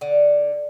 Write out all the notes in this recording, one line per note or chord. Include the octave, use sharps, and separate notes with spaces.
D3